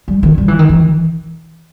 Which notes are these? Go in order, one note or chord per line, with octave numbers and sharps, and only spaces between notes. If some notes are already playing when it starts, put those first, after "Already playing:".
G3
D#3
G3
E3
D#3
E3